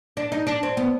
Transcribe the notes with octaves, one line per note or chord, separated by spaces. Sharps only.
D4
D#4
D4
C4
B3